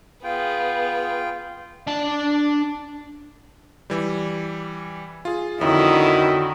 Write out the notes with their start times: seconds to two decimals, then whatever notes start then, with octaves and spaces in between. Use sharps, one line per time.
0.24 B3 F4 G#4 F5 G5
1.87 D4 A5
3.90 E3 G3
5.25 F4 G#4
5.61 F2 D3 D#3 F#3 E4 F#4 D#6